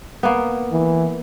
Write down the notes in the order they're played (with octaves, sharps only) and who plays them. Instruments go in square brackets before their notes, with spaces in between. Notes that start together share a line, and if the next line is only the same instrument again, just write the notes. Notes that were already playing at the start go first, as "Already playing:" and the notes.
[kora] A#3 B3
[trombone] E3